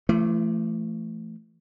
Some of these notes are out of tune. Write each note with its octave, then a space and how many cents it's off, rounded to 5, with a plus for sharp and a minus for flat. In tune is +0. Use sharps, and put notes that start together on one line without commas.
E3 +45 A3 +0